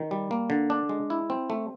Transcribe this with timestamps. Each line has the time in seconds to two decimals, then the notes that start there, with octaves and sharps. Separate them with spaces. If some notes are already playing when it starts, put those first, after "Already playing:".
Already playing: D#3
0.11 G3
0.31 A#3
0.50 D3
0.70 D4
0.89 G#3
1.10 E4
1.30 C4
1.50 A3